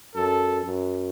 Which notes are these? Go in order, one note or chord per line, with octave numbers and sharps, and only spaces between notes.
F#2 A4
F#2